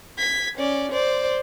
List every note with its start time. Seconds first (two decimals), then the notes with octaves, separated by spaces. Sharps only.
0.18 G#6 B6
0.58 C#4 D5
0.92 C5 D5